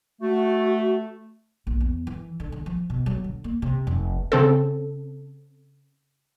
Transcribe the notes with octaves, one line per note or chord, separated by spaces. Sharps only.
A3 F#4
A#1
E2
E3
D3
D3
F3
B2
F#3
D3
A#3
C3
F1
C#3 C4 A4